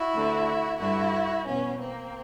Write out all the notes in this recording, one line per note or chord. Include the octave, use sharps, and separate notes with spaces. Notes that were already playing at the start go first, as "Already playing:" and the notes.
Already playing: E4 F#4
D2 D3
G2 D3 E4 F#4
E2 B2 B3 C#4
A#3 C4